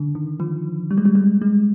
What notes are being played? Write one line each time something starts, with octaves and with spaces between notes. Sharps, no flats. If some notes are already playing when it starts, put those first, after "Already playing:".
Already playing: D3
D#3
F3
G3
G#3
G3
G#3
G#3